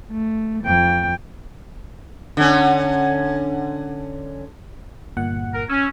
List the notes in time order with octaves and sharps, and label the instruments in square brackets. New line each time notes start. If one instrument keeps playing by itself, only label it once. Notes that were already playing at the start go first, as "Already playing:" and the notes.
[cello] A3
F2 G5
[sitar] D3 C#4
[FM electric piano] G1 A#2 F#5
[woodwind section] A#4
[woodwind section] C#4 [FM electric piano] E6